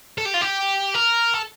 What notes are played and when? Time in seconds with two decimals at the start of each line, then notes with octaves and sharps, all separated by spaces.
0.18 A4
0.25 G4
0.34 F4
0.41 G4
0.95 A#4
1.34 A4